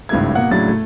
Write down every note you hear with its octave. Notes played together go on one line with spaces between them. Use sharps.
G#1 C#2 G2 A3 E4 G#6
B2 A#3 F#5
A2 C#3 F#3 D4 A6
A3